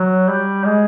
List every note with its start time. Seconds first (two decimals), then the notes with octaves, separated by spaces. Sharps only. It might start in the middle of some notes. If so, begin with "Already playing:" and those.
Already playing: F#3
0.29 G3
0.65 G#3